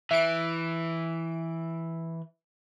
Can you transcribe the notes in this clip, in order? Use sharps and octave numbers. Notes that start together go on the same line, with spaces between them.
E3 E5 D7